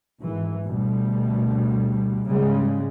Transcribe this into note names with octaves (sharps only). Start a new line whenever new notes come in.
G#1 E3
D2 B2 G3
G#2 C#3 G3 G#3